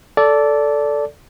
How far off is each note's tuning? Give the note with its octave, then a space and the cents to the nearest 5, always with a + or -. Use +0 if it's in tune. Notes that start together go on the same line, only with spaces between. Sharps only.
A4 +0 D5 -15